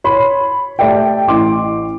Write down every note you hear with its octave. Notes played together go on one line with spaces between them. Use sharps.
C#5 B5 C6
A3 G4 D5 E5 G5
A1 C6 D6